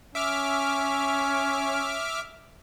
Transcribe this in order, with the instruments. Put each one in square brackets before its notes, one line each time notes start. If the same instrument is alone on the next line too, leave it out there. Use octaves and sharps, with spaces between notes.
[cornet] C#4 [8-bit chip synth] E5 D6 F6